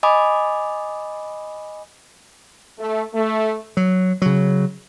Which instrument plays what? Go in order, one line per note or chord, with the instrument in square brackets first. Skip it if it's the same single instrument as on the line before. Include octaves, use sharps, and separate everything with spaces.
[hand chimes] D#5 G#5 B5 D6 D#6
[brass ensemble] A3
A3
[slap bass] F#3
C#3 F#3